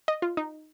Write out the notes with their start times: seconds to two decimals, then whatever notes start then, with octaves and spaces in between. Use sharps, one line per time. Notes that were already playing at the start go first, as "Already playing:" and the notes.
0.08 D#5
0.22 F4
0.37 D#4